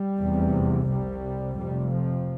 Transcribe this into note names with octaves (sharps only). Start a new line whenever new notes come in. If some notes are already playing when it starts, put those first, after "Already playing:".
Already playing: G3
F1 E2 C3
C2 C3 G3
F1 F2 C3 G3
F3